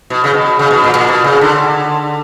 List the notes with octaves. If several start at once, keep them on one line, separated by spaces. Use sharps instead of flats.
B2
C#3
B2
C#3
B2
A#2
A#2
B2
C#3
D3